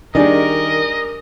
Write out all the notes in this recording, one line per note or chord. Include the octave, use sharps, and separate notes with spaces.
D#3 G3 D4 G#4 A#4 D#5